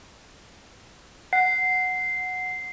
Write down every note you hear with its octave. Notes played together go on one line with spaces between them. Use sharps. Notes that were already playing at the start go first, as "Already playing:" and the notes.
F#5 C7